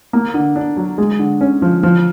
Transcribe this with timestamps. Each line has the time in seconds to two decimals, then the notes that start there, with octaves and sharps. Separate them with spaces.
0.13 A#3
0.34 D3
0.56 D4
0.77 F#3
0.98 G#3
1.19 D3
1.41 C#4
1.62 F3
1.83 F3